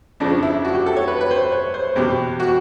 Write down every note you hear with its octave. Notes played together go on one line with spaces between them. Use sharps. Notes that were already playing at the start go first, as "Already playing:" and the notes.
F2 C#3 F3 D4
E4
F#4
G4
A4
C#5
B4
B4
C5
C#5
C5
E2 B2 G4
F#4